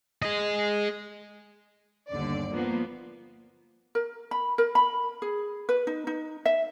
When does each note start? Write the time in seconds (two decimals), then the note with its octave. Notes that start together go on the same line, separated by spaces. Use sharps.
0.22 G#4 D#5
2.09 G1 D#2 D3 D5
2.51 F3 A#3 B3
3.95 A#4
4.31 B5
4.58 A#4
4.75 B5
5.22 G#4
5.69 B4
5.87 D#4
6.07 D#4
6.45 E5